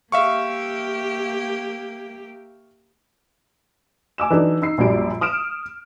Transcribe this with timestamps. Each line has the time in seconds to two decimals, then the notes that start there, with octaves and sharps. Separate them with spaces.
0.12 A#3 G4 E5 F5 C#6
4.18 G#5 D6 E6 E7
4.30 E3 F#3 D4 D#4 A4
4.62 D#4 E6 C7
4.78 A#1 F#2 G3 D7
5.21 D#6 F6 D7 E7